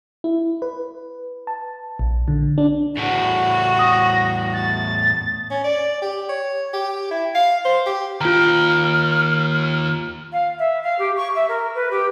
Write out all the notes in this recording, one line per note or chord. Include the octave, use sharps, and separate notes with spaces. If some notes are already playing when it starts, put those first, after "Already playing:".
E4
B4
A5
A#1
D3
D4
E2 A2 F#4
D#6 A#6
A6
C#4
D5
G4
C#5
G4
E4
F5
C5
G4
D#2 F4 G5 A#5 F6
F5
E5
F5
G4
C#6
E5
A#4
B4
G4